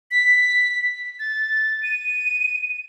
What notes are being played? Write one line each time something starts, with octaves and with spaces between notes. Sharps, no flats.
B6
A6
D#7